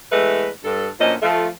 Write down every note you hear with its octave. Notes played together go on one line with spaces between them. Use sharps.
E2 G#3 A3 B4
G2 A4
D2 A#2 F3 C#4 C5 D#5
F3 A3 F4